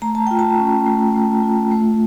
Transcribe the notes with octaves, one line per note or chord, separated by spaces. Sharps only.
A3 A#5
A5
F4 G5
A5
C#4
A3
A3
F4
A3